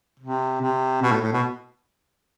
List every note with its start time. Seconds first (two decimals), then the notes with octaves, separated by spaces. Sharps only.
0.20 C3
0.61 C3
1.02 B2
1.12 A2
1.22 A2
1.32 B2